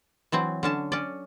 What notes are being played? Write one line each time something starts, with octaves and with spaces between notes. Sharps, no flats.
E3 F#3 C4
D3 C#4 A5
C#4 D5